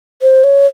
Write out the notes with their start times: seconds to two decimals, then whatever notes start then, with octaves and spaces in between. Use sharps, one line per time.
0.22 C5
0.44 C#5